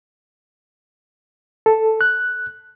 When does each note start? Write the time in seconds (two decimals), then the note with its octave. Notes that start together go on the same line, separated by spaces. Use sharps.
1.66 A4
2.01 F#6